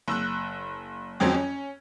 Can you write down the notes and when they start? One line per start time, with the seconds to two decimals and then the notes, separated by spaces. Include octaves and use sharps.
0.08 F#1 E6 F#6
1.20 F2 F#3 C4 C#4
1.34 C#4